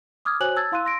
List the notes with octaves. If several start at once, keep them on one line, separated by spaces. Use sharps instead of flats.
D6 D#6 F6 G#6
F#4 C5 C#5 G#5 F#6 F#7
A5 E6 G#6 A6
E4 F5 C6 E6 F#6 D#7
C6 A#6 D7